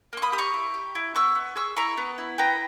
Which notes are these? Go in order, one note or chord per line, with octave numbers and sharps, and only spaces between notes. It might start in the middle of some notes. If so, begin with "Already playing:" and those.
A#3 C#6
B5 D#6
G4 D#6
A#5 C#6
E4
G4
E4
B3 C#6 E6
B3
G#4 C#6 E6
E4 A#5 C#6
B3
E4
B3 G5 A#5